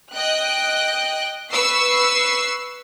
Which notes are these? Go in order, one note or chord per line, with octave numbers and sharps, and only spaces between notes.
D#5 G5 F#6
B4 C#6 E6 C7